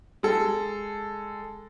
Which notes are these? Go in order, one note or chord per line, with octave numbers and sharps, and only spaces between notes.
G#3 A4